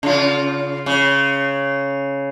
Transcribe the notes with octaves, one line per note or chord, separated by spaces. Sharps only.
C#3 F4
C#3